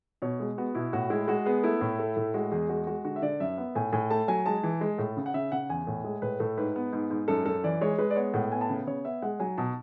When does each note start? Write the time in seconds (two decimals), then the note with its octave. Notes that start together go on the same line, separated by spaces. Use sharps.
0.22 B2 C#5
0.40 G#3
0.58 B3 F#4
0.75 B2 E4
0.93 A2 F#4
1.10 G#3 E4
1.28 G#3 F#4
1.45 B3 G#4
1.63 A3 E4
1.81 A2
1.99 A3
2.17 A2
2.34 G#3 F#4
2.52 E2 G#4
2.69 G#3 F#4
2.87 G#3 F#4
3.04 D3 F#4
3.16 E5
3.22 D3 D5
3.40 F#2 E5
3.58 B3
3.75 A2 G#5
3.93 A2 G#5
4.10 A3 A5
4.28 F#3 G#5
4.46 G#3 A5
4.63 E3
4.81 G#3
4.98 A2
5.17 C#3
5.26 F#5
5.34 C#3 E5
5.52 C#3 F#5
5.70 E2 G#5
5.87 A2
6.04 G#3
6.22 A2 B4
6.40 A2 A4
6.58 G#2 B4
6.76 B3
6.93 G#2
7.10 G#2
7.28 F#2 A4
7.46 F#2 A4
7.64 E3 D5
7.81 G#3 C#5
7.98 G#3 B4
8.11 D5
8.16 B3 C#5
8.34 A2 F#5
8.52 B3 G#5
8.61 A5
8.69 C#3
8.87 C#3 C#5
9.05 B3 E5
9.22 G#3 F#5
9.40 F#3 G#5
9.58 B2 A5